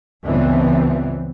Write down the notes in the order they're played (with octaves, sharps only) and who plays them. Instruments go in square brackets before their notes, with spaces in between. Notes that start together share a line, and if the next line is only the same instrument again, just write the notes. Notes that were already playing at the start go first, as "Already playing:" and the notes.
[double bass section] C#2 G2 E3 F3 B3 C4